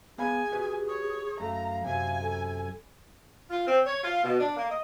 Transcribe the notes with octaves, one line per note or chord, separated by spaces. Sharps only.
B3 G#4 F5 G#5 B5
F#4 G4 B4
C#5
F#2 A3 F5 A#5
F#2 C3 G#5
A4
F4
C4
C#5
F4
B2
D4
A#3
D#5